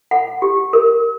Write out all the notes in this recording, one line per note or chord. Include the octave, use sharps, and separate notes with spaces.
F#5
G4
A#4